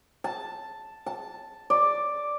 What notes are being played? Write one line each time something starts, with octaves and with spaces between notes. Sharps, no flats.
A5
A5
D5